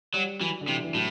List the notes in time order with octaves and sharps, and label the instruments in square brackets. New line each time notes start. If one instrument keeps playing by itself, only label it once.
[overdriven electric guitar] F#3 [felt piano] G3
[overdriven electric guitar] E3 [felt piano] F#3
[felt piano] D3
[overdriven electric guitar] C3 [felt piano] E3
[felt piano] E3
[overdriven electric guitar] A2 [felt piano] F#3